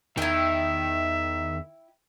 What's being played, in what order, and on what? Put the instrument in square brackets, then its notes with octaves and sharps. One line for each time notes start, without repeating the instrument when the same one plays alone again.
[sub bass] E2 [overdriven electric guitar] D#3 [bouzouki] E4 G5 [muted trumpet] E5